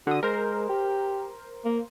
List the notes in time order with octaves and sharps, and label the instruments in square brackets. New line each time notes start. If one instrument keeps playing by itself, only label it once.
[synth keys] D3 D#6 [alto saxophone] F#4
[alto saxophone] G#3 [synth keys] A#4 C5
[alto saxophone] G4
A#3